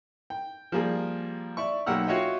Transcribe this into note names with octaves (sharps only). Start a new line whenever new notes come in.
G5
F3 G3 A#3 G#4
D5 E5 C#6
B1 A#3 G4 F#5 E6 F6
F4 F#4 C#5 D#5 E5 G5